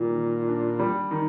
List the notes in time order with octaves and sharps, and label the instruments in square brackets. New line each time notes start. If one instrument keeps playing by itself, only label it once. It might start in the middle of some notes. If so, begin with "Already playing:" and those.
Already playing: [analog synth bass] A#2 [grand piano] D#3 G3
[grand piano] D#3
D4
G3
D#3